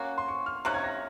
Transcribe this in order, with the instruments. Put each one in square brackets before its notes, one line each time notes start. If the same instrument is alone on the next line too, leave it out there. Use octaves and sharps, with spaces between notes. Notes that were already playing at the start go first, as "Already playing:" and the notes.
Already playing: [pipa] A#3 C#4 F#4
[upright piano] C6
C#6
F6
[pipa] C3 D#3 A#3 C#4 [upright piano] F#6
[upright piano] G#6
A#6